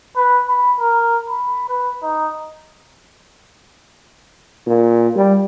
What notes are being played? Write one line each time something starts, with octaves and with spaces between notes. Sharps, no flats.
B4
B5
A#4
B5
B4
D#4
A#2
G3